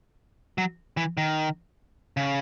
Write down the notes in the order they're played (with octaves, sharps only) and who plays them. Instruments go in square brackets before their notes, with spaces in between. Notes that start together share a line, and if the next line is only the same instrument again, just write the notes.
[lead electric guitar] F#3
E3
D#3
C#3